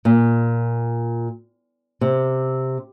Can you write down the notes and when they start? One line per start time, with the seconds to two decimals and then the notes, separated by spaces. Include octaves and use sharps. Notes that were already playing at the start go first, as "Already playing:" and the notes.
0.05 A#2
2.01 C3